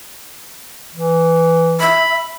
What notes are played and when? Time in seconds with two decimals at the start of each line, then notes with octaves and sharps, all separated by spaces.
0.95 E3
1.80 E5 B5